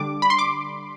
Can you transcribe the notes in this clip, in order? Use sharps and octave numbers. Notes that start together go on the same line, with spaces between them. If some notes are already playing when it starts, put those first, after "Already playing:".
Already playing: D3 G3 D4 D6
B5
C6
D6